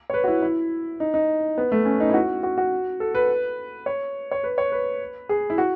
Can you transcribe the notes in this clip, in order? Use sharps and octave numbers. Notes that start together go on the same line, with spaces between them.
C#5
B4
F#4
E4
E4
D#4
D#4
B3
A3
C#4
D#4
E4
F#4
F#4
F#4
A4
B4
C#5
C#5
B4
C#5
B4
G#4
E4
F#4